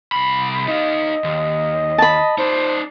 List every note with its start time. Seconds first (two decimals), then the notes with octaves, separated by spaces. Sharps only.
0.12 C2 B5
0.68 D#4 D#5 F5
1.24 D#2
1.98 A5 B5
2.38 D#4 C5 D5